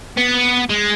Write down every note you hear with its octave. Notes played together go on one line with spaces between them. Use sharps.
B3
G#3